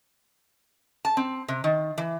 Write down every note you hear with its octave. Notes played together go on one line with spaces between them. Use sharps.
A5
C4
C3
D#3
E3